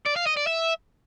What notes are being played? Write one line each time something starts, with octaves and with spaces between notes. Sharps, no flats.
D5
F5
D#5
D5
E5